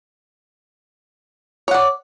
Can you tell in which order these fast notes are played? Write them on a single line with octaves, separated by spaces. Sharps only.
C#5 F#5 D5